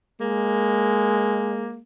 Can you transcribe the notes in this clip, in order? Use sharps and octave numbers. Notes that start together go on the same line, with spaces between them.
G#3 A#3